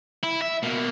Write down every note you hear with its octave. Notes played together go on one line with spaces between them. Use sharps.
E4
E5
B2 A#3